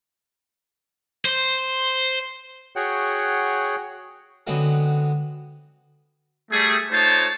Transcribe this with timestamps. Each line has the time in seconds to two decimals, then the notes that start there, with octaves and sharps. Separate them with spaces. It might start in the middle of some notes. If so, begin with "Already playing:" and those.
1.25 C5
2.76 F#4 G#4 C#5 F#5 G5
4.47 D3 F#3 G#3 B3 C4
6.52 G3 A3 G#4
6.92 A3 D#4 F4 C5 C#5 A5